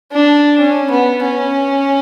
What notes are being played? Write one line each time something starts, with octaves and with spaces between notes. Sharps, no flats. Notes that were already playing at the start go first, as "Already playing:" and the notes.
D4
C#4
B3
C#4